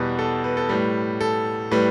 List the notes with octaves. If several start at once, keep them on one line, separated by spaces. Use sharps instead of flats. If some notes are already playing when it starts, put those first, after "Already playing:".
Already playing: E2 B2 G3 B4
A4
B4
A4
A2 G3 B4
A4
A2 G3 B4